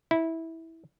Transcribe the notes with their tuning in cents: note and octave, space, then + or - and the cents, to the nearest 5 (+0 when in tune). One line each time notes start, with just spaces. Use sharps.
E4 -15